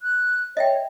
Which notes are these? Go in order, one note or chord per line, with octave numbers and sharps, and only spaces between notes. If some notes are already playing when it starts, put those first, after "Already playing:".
F#6
C#5 D#5 E5 G5